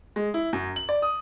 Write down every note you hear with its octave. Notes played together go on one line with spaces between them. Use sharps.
G#3
E4
F#2
F#7
D5
D#6